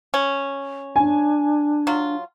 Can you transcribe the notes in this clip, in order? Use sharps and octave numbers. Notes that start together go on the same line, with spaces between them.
C#4
D4 G#5
F#3 F4